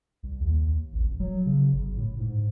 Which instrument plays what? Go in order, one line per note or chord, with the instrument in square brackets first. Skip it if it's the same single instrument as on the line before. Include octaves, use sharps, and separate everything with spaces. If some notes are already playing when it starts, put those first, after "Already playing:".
[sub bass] C2
D#2
A1
D#1
F#3
C#3
G1
A2
G#2